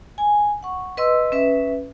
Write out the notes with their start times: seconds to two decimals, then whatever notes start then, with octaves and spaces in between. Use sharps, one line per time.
0.18 G#5
0.63 F#5 C#6
0.97 B4 D#5 C6 E6
1.32 C#4 B4 E5